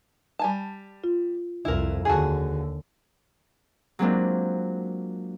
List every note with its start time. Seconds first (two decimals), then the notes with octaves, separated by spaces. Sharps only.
0.39 G3 G#5 A5
1.04 F4
1.65 C2 F2 E4 A#4
2.05 D#2 D3 F#4 G#4 G#5 A5
3.99 F#3 G#3 A#3 C4 D4 F4